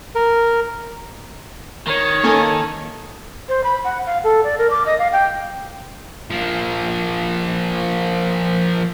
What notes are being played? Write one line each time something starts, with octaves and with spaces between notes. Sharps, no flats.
A#4
D#3 C#5
A#3 C#4 D#4 A4 G#5
C5
B5
F#5
F5
A4
D5
A#4
D6
D#5
F5
G5
F3 A#3